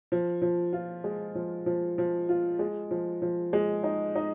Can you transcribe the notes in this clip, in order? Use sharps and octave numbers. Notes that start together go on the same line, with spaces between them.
F3
F3
F4
G#3
F3
F3
F3
F4
G#3
F3
F3
G#3
D#4
D#4